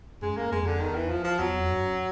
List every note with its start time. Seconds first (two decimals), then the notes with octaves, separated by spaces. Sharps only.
0.22 F#2 G#3
0.37 A#3
0.52 F2 G#3
0.66 D3
0.80 E2 D#3
0.95 E3
1.10 F3
1.24 F3
1.38 E2 F#3
1.58 F2
1.72 G2
1.78 F#2